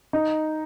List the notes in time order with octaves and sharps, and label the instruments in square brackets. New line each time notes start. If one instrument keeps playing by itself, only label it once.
[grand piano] D#4